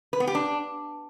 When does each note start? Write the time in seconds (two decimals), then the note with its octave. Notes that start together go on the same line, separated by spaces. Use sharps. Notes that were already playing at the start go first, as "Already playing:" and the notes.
0.13 B4
0.20 B3
0.27 G4
0.35 D4